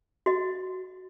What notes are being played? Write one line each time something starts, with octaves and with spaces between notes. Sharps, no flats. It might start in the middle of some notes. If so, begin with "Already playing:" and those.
F#4 D#5